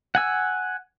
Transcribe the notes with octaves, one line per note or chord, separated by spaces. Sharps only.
F#5 G#5 E6